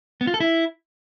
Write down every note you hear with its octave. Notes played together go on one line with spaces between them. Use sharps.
B3
F4
A4
E4